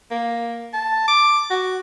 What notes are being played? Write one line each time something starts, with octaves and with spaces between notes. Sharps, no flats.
A#3
A5
D6
F#4